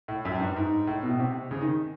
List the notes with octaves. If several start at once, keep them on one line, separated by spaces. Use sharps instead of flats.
A2
F#2
G2
G#2
A2
B2
C3
C#3
D#3